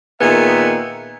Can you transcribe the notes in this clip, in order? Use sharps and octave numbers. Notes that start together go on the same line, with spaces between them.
A#2 D#3 B3 G#4 E5